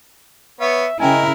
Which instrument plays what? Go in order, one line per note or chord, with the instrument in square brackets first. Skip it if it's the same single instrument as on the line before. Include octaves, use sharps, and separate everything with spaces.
[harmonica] B3 C#5 [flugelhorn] E5
[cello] C#3 E4 [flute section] C#4 D#5 G5 [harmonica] A#4 [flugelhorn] G#5